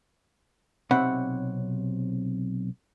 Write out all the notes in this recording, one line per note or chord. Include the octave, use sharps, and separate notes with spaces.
B1 C3 C4 C#5 F#5 B5